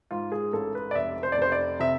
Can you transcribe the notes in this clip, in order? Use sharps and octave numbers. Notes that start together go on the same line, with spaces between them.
G#2 F4
G#4
A1 A4
B4
D5
F1 E5
C5
D5
F1 C5
D5
C3 E5